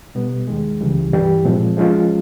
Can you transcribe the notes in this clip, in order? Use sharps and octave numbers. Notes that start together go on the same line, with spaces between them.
B2 G3 B3
D#2 D#3 G#3
C#2 C#3 E3 G3
G2 E3 G3
A#2 F3 G#3 C4
F3 G#3 C#4 F4